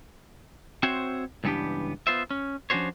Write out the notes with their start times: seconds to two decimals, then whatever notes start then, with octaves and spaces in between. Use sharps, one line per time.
0.83 C4 F#4 C5 C#5 E5
1.44 C#2 G2 E3 B3 D4 G4
2.07 B3 F4 C5 E5
2.31 C#4
2.70 F3 C#4 D4 F#4 C5 C#5